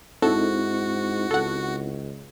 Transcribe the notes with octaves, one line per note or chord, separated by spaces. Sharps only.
G#2 C4 D#4 E4 F#4 A4
C#2 A4 F#5